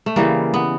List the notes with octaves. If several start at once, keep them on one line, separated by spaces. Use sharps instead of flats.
A3
C#3 E3 G3 A#3
B3